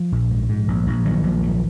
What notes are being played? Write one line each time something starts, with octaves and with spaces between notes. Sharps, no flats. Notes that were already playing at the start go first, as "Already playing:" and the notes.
Already playing: F3
A#1
G#2
G#2
A#1
A#1
A#1 D#3 F#3
A#1
G#2